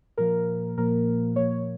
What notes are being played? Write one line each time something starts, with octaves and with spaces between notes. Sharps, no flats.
A#2 F3 A#3 A#4
A#2 F3 A#3 A#4
A#2 F3 A#3 C#5